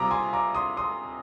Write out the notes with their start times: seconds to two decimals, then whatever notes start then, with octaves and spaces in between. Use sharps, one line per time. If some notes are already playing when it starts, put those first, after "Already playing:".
Already playing: C3 G3 C4 F4 A#5 D6 D#6
0.11 G#5 C6
0.33 A#5 D6
0.55 C6 D#6
0.77 C6 D#6